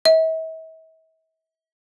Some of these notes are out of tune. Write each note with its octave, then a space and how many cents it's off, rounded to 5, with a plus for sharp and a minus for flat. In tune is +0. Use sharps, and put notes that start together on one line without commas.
E5 -45